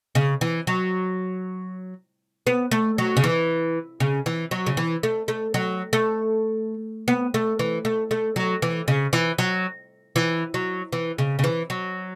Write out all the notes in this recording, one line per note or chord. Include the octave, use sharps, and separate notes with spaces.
C#3
E3
F#3
B3
A3
F#3
C#3
E3
C#3
E3
F#3
C#3
E3
A3
A3
F#3
A3
B3
A3
E3
A3
A3
F#3
E3
C#3
E3
F#3
E3
F#3
E3
C#3
C#3
E3
F#3